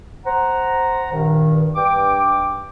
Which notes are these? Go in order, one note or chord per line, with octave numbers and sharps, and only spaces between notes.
C5 F#5 A#5
G2 A#2 D#3
G2 G5 D6